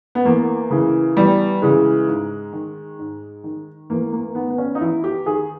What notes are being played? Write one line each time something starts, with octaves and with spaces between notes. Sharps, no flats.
B3
E2 A#3
C#3 E3
E2 G3
C#3 E3 G#3
G#2
D#3
G#2
D#3
E2 A#3
A#3
D#3 B3
B3
C#4
D#4
E2 E4
G4
D#3 G#4